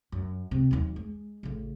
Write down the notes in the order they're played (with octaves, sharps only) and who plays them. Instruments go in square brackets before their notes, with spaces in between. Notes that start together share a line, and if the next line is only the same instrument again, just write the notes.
[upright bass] F#2
C3
D#2 F#3
G#3
A1 C#3